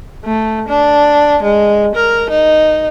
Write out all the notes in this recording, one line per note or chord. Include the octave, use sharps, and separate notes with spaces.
A3
D4
G#3
A#4
D#4